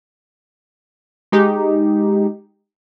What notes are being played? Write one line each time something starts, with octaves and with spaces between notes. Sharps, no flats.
G#3 D#4 G4